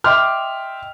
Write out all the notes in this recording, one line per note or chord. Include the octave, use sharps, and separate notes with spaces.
D#5 E5 G5 C6 D6 F6